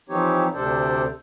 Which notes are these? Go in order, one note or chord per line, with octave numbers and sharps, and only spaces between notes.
E3 F3 C4 D#4 G4 C#5
D2 C3 D4 A4 C5 D5